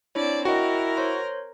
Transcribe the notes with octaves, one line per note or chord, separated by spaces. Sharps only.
C4 D4 E4 C#5 D5
E4 F#4 A#4 D#5 G5
C5 C#5 C6